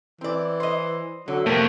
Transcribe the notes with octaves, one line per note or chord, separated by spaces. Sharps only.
E3 C4 D5
C5 D#5
D3 F#3
F2 C3 A3 A#3